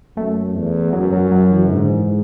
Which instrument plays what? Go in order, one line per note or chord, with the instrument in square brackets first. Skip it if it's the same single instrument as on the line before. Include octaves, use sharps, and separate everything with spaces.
[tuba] F#2 [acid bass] A3
[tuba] E2
[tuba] F#2 [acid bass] F#3
[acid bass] F#3
F#3
E3
C#3
[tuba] G#2 [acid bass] D3
[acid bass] E3
G#3